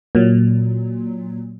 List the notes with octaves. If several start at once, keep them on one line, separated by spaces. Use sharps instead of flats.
A#2 F#3